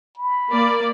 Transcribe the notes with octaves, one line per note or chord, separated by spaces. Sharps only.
B5
A#3 D5